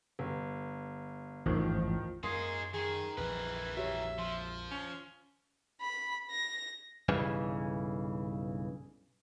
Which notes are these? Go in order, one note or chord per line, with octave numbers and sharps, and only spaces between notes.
G1
A1 F2 G#2 D#3 F3
F#2 F#3 A#3 D#4 G#4 C6 D#6 C7
D#3 G#4
A#1 F2 E3 A#4 B4
F#4 G4 C#5 E5
F3 C6
C#4
B5
A#6
B1 G2 C#3 E3